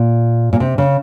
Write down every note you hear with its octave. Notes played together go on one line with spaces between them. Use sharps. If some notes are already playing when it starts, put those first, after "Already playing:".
Already playing: A#2
A#2
C3
C#3